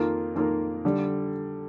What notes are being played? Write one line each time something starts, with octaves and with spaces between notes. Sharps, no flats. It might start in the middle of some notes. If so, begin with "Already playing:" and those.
Already playing: F2 D#3 A#3 F4 A#4
F2 D#3 A#3 F4 A#4
D3 G3